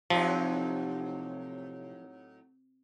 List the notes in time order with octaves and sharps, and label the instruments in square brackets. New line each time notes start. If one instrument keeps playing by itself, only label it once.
[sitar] A2 F#3 D#4 [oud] C3 [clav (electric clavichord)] F3